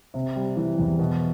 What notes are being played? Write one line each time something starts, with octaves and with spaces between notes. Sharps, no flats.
C3
G3
E3
E2
B2